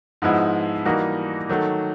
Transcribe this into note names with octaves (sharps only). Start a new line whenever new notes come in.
G#2 F3 G#3 B3 E4
E3 G3 A#3 D#4 F#4
D#3 F#3 A3